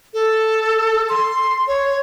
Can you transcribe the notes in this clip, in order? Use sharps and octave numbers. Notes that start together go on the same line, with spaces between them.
A4
C6
C#5